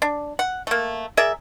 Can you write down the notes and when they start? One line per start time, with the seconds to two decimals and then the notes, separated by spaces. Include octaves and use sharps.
0.02 D4
0.39 F#5
0.67 A3 A#3
1.17 G#4 A#4 D5 E5